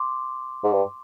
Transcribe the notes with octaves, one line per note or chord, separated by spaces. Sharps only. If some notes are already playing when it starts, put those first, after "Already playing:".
Already playing: C6 D6
G#2
G2